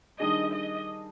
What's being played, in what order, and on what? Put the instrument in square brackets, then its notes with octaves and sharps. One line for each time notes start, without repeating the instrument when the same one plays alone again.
[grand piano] D#3 G3 D4 G#4 [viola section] D#5
[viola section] D#5